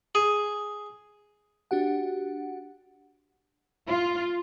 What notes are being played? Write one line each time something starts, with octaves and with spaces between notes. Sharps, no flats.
G#4
D4 F#4 G4 F#5
F4